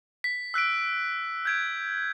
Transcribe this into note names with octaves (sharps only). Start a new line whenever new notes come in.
B6
E6 F#6 B6 D7
G6 G#6 D7